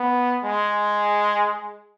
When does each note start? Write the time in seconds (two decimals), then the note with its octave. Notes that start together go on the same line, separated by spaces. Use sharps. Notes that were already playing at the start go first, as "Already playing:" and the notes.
Already playing: B3
0.44 G#3